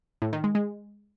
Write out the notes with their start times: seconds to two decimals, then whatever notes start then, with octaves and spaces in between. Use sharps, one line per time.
0.22 A2
0.33 D#3
0.44 G#3
0.55 G#3